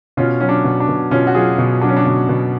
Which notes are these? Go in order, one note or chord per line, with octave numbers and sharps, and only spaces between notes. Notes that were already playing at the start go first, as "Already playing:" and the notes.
B2 C#4 F4
F#3 C#4
D4
B2
D4
B2
B2 C#4 F4
F#4
F#3 F4 G#4
B2
F#3 D4
C#4
D4
B2
B2